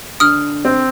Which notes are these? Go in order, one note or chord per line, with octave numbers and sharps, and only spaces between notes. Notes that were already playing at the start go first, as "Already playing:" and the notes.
D3 D#6 F6
C4